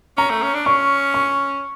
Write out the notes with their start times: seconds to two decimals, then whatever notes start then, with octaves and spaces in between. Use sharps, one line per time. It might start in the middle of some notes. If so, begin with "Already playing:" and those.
0.17 C#4 A#5
0.30 A3
0.42 C#4
0.54 D4
0.66 C#4 C#6
1.14 C#6